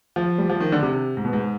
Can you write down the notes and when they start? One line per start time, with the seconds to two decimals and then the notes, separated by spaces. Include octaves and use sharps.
0.16 F3
0.38 G3
0.50 F3
0.61 D#3
0.72 D3
0.83 C3
1.17 G#2
1.25 B2
1.33 G#2